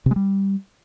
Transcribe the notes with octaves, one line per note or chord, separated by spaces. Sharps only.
C3
G#3
G3